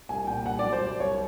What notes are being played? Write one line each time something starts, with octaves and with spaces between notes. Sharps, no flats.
C2 G#5
A#2 G5
C2 F#5
D5
F#3
C5
C2 D5
C2 C#5